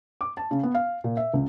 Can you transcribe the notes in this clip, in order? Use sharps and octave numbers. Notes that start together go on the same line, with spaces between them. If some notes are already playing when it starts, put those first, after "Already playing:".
D6
A5
C#3
B3
F5
A#2
E5
C#2